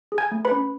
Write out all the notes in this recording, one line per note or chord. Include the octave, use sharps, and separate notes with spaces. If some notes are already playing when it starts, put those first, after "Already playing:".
G#4
G#5 G#6
A3
B4 B5
C#4